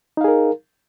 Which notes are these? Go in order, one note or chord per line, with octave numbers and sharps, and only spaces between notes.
D#4 G#4 A#4 F5